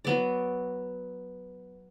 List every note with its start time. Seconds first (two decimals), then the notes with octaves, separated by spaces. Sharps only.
0.05 F#3 B3 D5